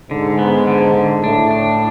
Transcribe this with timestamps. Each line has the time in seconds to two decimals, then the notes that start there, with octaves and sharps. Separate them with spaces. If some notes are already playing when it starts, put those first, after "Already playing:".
0.11 G#2 D3
0.39 B3
0.67 D3
0.94 D3
1.23 A2 D4
1.51 D4